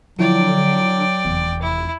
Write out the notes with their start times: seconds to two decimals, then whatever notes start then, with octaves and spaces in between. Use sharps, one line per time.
0.19 D3 F3 F#3 E4 D5 G5
1.25 F1 E2
1.62 E4